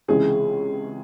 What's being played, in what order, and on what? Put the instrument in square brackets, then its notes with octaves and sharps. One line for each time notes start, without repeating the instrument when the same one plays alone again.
[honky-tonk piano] C#2 C3 E3 G#3 C#4 [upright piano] G#4